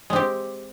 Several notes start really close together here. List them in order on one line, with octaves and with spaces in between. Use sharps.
G#3 C4 G4